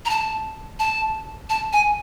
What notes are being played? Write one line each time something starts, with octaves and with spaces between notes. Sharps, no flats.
A#5
A5
A5
A5
G#5